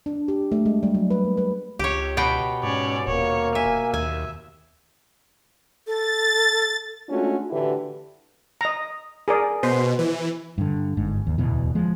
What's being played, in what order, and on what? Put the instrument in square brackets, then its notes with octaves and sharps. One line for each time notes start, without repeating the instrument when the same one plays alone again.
[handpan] D4
G4
A3
G#3
G3
F#3
B4
A#3
B4
[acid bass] C#2 [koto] G4 C#5
[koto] B2 B3 G5
[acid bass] G#2 [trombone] C#4 [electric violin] C#5 D5
[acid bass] D#1 [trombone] A#3 [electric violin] C#5
[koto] E5 [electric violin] G#5
[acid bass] D#2 [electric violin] E5 [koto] G#5
[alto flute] A4 [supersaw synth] A6
[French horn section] G#3 A3 C#4 D4 F4 F#4
A2 D3 E3 E4 F#4 G4
[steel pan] D#5 A#5
G#4 A#4 D5
[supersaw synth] B2 [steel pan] C5
[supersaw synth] E3
[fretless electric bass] G2 D3
G1 G#2
D#2
D1 E2 B2 E3
F3 G#3